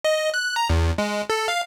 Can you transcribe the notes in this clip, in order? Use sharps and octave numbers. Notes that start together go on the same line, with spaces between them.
D#5
F#6
A#5
E2
G#3
A4
F5